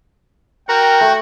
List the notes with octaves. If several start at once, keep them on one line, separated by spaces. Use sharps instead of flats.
F#4 A#4 G5
A3